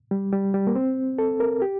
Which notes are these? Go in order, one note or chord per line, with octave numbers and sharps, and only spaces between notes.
G3
G3
G3
A#3
C4
A4
A#4
G4